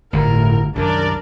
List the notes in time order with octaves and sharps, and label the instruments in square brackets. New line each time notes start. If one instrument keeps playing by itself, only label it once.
[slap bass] G1 D2 [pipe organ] A2 [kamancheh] A#4
[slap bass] C2 F#2 D#3 [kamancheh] D4 A#4 [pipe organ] D5